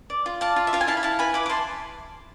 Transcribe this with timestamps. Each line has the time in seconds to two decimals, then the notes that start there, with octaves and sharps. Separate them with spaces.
0.10 D5
0.26 F4
0.41 D5 F5 A5
0.56 F4
0.67 E5
0.73 F4 F5
0.81 G#5
0.87 E4 F5 A5
0.97 B5
1.03 E4 F5 A5
1.19 B4 G#5 B5
1.34 E4 B5 D6
1.46 D6
1.50 E4 A5 C6